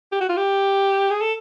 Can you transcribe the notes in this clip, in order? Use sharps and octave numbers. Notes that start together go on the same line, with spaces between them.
G4
F#4
F4
G4
G#4
A4